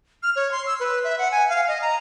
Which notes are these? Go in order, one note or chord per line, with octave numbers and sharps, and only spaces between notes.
F6
C#5
C6
E6
B4
E5
F#5
G#5
F5
D#5
A#5